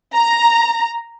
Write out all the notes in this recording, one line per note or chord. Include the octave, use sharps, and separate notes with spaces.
A#5